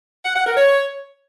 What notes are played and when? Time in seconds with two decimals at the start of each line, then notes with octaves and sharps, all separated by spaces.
0.25 F#5
0.36 F#5
0.46 A#4
0.57 C#5